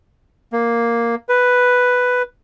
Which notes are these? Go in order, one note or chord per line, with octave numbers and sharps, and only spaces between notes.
A#3
B4